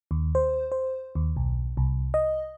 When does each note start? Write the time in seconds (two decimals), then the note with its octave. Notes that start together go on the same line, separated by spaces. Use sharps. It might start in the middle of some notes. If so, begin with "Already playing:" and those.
0.11 D#2
0.35 C5
0.72 C5
1.15 D#2
1.36 B1
1.77 C2
2.14 D#5